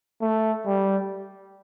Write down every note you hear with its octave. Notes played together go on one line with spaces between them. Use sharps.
A3
G3